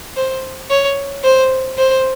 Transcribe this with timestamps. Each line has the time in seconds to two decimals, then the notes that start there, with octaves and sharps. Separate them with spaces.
0.16 C5
0.70 C#5
1.24 C5
1.78 C5